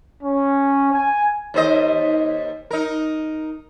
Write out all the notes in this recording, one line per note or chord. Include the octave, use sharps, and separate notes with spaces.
C#4
G#5
D#2 C5 D#5
D#4 A#4